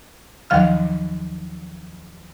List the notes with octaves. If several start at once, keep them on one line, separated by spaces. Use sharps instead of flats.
D#2 D#3 F3 F#3 F5 F6